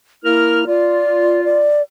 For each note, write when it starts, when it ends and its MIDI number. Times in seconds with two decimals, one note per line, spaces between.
0.24 0.61 58
0.24 0.65 64
0.24 0.61 70
0.24 0.61 89
0.67 1.64 65
0.67 1.44 74
1.44 1.82 74